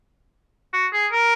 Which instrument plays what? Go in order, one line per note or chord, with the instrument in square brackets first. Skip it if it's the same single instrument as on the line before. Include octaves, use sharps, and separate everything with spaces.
[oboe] F#4
G#4
A#4